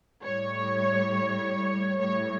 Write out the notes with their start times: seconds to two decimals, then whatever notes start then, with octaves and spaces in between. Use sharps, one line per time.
0.23 A2 G3 C#5
1.99 A2 G3 C#5